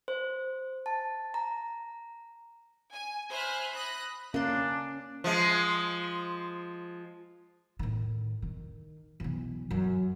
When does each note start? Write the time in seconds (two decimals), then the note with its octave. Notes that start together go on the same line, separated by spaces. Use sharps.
0.08 C5
0.86 A5
1.34 A#5
2.92 G#5
3.30 C5 E5 G#5 B5 F6 F#6
3.75 B5 D#6 F#6 A#6
4.34 A#3 C#4 D4 C6
5.24 F3 G#3
7.79 A2 D#3
8.42 D#3
9.20 B1 E3
9.71 F#2